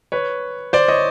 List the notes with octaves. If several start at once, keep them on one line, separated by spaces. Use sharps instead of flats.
B4 C#5
C5 D5
C#5 D#5